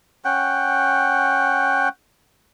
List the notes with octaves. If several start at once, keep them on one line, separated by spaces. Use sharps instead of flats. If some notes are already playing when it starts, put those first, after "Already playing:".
C#4 F#5 G5